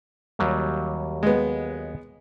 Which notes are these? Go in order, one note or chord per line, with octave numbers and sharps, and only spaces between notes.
D#2 F#3 G3
G#3 B3